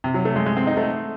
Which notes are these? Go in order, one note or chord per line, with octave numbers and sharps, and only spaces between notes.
C3
F#3
A3
G#3
G#3
C4
D#4
A3